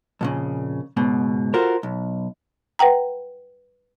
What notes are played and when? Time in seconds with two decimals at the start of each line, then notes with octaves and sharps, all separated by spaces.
0.21 F2 A#2 C#3
0.97 C#2 G#2 B2
1.54 F4 F#4 A4 A#4 C5
1.83 B1
2.79 B4 F#5 G5 A#5